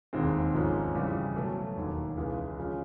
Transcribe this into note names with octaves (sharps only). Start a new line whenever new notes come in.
E1 D#2 D#3 G#3 C4
G#1 G#2 F3 G#3 C#4
F2 C#3 E3 G3
B2 F#3 A3
E1 D#2 D#3
C#2 C#3 E3 G#3
C#3 F3 G#3 C#4